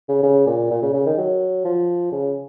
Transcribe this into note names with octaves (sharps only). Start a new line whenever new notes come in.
C#3
C#3
A#2
A#2
C#3
C#3
D#3
F#3
F3
C#3